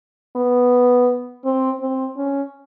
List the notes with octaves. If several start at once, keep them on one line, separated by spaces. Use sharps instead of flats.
B3
C4
C4
C#4